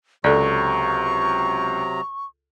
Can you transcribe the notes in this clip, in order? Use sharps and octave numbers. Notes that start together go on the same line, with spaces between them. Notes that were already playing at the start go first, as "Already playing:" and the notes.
C#2 C3 F#3 A4 D5 A#5 C#6